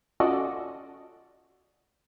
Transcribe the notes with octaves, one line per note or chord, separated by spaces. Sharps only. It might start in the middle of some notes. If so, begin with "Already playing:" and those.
C#4 F4 F#4 A4 D5 D#5